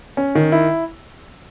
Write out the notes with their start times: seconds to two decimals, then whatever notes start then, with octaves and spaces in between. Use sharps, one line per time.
0.17 C#4
0.35 D#3
0.52 E4